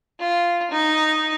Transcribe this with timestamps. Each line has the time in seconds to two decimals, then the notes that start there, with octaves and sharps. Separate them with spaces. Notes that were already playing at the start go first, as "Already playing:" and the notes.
0.20 F4
0.71 D#4